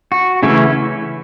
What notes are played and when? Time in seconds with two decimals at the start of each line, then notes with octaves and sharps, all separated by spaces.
0.12 F#4
0.43 C#3 E3 A3 C#4 E4